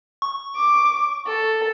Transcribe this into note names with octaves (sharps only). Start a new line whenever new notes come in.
C#6
D6
A4